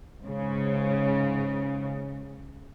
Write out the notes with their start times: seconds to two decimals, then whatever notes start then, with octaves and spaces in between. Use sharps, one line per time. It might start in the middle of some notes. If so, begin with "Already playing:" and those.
0.21 G#2 C#3